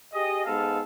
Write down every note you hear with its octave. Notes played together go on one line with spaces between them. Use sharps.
G4 G#4 D#5
G#2 B3 A4 F5